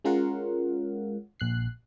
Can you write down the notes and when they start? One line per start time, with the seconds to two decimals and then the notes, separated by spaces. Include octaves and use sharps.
0.05 G#3 C#4 F4 A#4 F5 F#5
1.40 A#1 F#6 C7